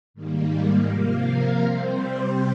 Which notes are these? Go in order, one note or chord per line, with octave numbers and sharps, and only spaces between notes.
G#2 D#3 G3 A#3
C3 F3 A#3 F5
A#4
C3 G3 C4 C5